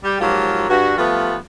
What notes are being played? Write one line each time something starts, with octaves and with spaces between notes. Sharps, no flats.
G3 G4
G#2 F3 F#3 A#3 F4 G4
G2 F#4
F3 G3 A3 B3 F4 B4